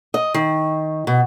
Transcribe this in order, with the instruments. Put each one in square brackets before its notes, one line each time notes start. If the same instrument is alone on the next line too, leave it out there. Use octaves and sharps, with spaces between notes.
[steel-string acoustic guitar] D#5
D#3
B2